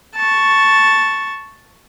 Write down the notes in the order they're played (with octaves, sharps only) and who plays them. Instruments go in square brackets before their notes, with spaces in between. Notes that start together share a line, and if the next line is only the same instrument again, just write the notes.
[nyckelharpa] A5 C#6